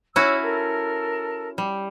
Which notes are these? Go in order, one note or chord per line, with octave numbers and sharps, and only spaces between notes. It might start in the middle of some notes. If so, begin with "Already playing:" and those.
C#4 E4 F#4 C#5 C#6 E6
A4 A#4 A5
G3